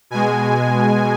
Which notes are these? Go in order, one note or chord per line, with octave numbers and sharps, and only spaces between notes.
B2 G#3 G#5